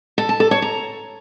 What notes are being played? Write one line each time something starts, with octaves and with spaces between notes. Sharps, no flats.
A4
A5
A4
C#5
A#5